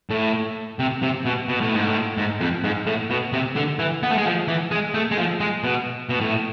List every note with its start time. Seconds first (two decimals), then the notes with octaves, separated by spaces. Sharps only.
0.10 A2
0.79 C3
1.02 C3
1.25 B2
1.48 B2
1.61 A2
1.73 G#2
1.87 A2
2.17 G#2
2.40 F2
2.64 G#2
2.86 A2
3.10 B2
3.33 C3
3.56 D3
3.79 E3
4.03 B3
4.10 A3
4.17 G#3
4.26 F3
4.48 E3
4.71 G#3
4.94 A3
5.11 G#3
5.18 F3
5.40 G#3
5.64 B2
6.09 B2
6.21 A2